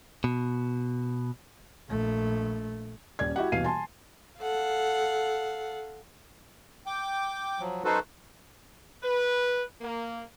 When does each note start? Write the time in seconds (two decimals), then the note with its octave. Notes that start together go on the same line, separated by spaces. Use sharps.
0.24 B2
1.89 A#1 A3
3.19 D#1 C#4 D5 G#6
3.36 E4 F#4 G4 F#5
3.52 D#1 B2 E3 F5 C7 D#7
3.64 G#5 A5 C6
4.41 A4 F5 F#5
6.86 G5 D6
7.60 F3 F#3
7.85 F#2 D#4 F#4 A4 B4 C5
9.03 B4
9.81 A#3